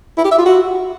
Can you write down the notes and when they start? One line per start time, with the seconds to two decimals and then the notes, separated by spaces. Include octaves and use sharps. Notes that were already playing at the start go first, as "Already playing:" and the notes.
0.17 E4
0.24 G4
0.31 E5
0.38 F4
0.45 F#4